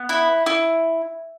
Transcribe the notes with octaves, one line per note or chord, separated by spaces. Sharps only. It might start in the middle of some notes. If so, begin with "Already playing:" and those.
Already playing: B3
E4
E4